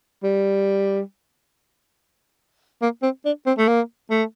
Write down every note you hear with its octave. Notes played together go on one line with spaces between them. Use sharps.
G3
A#3
C4
D4
C4
A3
A#3
A3